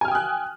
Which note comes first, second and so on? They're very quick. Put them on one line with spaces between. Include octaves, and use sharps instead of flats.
G#5 F6 G5 D#6 F#6